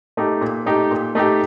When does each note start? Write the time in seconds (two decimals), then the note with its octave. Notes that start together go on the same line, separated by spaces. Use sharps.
0.17 A3 D#4 G4
0.41 A#2
0.66 A3 D#4 G4
0.91 A#2
1.15 A3 D#4 G4